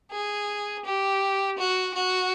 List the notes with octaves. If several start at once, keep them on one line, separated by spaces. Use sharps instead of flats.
G#4
G4
F#4
F#4